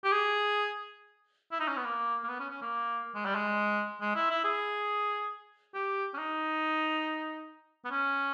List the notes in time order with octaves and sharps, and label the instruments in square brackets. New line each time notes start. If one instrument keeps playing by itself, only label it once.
[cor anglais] G4
G#4
E4
D#4
C#4
B3
A#3
A#3
B3
C#4
C#4
A#3
G#3
G3
G#3
G#3
E4
E4
G#4
G4
C#4
D#4
B3
C#4